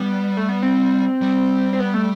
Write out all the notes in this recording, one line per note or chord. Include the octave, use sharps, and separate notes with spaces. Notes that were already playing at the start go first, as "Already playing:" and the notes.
Already playing: G3 B3
A3
B3
C4
G3
C4
B3
A3